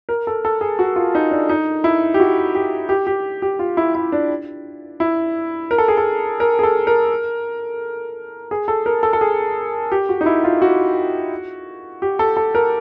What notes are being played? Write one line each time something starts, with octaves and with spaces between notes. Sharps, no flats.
A#4
A4
A4
G#4
F#4
F4
D#4
D4
D#4
E4
G4
F#4
G4
G4
G4
G4
F4
E4
E4
D4
E4
A#4
A4
G#4
A4
A#4
G#4
A4
A#4
G#4
A4
A#4
A4
A4
G#4
G4
F#4
D#4
E4
F4
F#4
G4
A4
A4
A#4